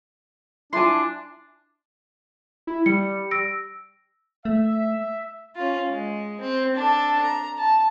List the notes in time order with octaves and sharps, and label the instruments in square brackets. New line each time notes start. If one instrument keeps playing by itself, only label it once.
[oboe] D4 [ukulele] E4 F4 G#5 [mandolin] A5 C6
[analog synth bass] E4
[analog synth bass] G3 [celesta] C#7
[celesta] E6 A#6 D7
[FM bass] A3 [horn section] E5
[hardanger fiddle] C#4 F4
G#3
C4
D4 A4
A#5
A5